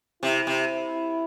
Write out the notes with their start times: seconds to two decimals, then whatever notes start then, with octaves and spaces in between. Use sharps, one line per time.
0.22 C3 E4
0.47 C3